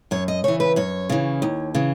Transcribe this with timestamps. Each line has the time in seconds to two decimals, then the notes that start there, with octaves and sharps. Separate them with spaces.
0.11 F#2 C#5
0.28 D#5
0.44 C#3 E3 C#5
0.60 B4
0.76 F#2 C#5
1.09 C#3 E3
1.42 D#2
1.75 C#3 E3